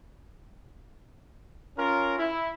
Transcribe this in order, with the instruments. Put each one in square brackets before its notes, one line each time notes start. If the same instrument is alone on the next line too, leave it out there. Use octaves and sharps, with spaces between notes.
[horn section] C#4 F4 A#4
E4